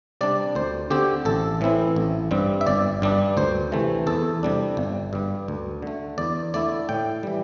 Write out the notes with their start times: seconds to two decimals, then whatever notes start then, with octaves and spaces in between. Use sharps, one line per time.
0.21 C3 G3 D4 D5
0.55 D2 C5
0.90 D3 C4 G4
1.25 A1 A4
1.61 A2 E3 C4 E4
1.96 A1
2.31 G2 G3 C4
2.61 E5
2.66 G1 D5
3.02 G2 G3 D4
3.37 D2 C5
3.72 C3 E3 A3
4.07 E2 A4
4.43 C3 G3 D4
4.77 G1
5.13 G2 G3
5.48 D2
5.82 D3 A3
6.18 E2 D5
6.54 D3 A3 E4 D5
6.89 A2 G5
7.23 E3 G3